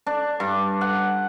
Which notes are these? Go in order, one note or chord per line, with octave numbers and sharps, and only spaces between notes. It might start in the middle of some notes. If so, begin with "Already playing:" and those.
D4
G2
F#5